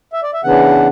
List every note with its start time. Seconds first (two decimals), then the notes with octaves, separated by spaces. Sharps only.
0.13 E5
0.23 D5
0.34 E5
0.44 C#3 E3 B3 D4 F#5